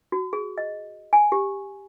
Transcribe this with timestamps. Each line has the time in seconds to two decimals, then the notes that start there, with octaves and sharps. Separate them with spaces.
0.12 F#4
0.33 G#4
0.58 D#5
1.13 G#5
1.32 G4